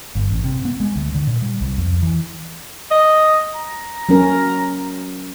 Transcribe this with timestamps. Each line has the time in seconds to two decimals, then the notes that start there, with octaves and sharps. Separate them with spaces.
0.15 G1
0.30 A1
0.44 C3
0.65 B3
0.80 G#3
0.95 D2
1.15 D3
1.27 A#2
1.42 G3
1.61 C2
1.78 F2
2.03 E3
2.91 D#5
3.55 A#5
4.09 F#3 C#4 A#4